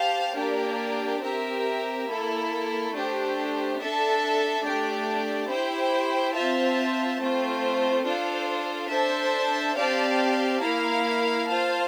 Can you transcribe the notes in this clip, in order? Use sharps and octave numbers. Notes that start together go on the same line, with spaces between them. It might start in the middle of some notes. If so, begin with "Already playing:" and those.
Already playing: G4 C5 F5 A5
A#3 D4 G4 D5
C4 G4 A#4 E5
A#3 E4 A4
A3 D4 G4 C5
D4 A4 E5 A5
A3 D4 G4 D5
E4 G4 C5 G5
C4 F4 C5 E5 A5
A3 C4 F4 C5
D4 F4 A4 C5 F5
D4 A4 C5 E5 A5
C4 G4 D5 F5 A5
A#3 E4 A#4 F5
F4 C5 F5 A5